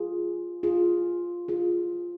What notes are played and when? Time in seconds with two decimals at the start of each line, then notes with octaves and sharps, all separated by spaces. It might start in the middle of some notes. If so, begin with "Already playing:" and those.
Already playing: F4 G#4
0.63 F4 G#4
1.48 F4 G#4